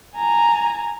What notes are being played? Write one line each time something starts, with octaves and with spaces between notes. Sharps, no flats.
G#5 A#5